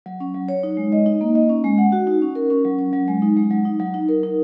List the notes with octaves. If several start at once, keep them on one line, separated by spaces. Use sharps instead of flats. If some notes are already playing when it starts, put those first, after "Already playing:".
F#3
C#4
F#3
C#5
D#4
G#3
D#5
D#4
A#3
D#5
C#4
G#3
F#5
F#4
D#4
C#4
A#4
C#4
F#3
C#4
F#3
G#3
D#4
G#3
F#3
D#4
F#3
D#4
A#4
D#4